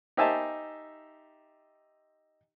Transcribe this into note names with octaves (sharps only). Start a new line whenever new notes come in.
D#4 G4 C5 E5 G#5 A5